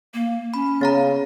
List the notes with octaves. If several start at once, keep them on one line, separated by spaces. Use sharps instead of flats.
A#3
C#4 B5
C#3 B3 F5 A#5